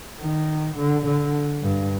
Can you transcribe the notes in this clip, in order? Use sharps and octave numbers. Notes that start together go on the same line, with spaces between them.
D#3
D3
D3
G2